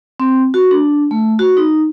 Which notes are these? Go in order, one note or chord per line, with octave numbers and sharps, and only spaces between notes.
C4
F#4
D4
A3
F#4
D#4